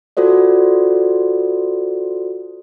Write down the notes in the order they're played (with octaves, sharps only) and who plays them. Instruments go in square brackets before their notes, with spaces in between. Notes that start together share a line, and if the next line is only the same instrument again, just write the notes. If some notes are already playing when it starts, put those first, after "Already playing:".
[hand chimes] F4 F#4 A4 C5 D5